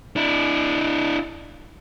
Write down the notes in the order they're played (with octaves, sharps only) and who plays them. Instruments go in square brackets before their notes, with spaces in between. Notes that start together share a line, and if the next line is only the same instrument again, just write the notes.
[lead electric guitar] D4 E4